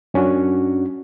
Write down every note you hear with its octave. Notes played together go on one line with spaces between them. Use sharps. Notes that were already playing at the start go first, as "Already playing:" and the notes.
F#2 C#4 D4 F#4